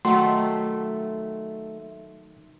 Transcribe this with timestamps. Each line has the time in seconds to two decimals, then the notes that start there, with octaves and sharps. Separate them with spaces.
0.05 D#3 F#3 A3 C6